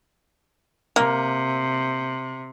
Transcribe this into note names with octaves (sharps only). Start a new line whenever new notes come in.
C3 A#3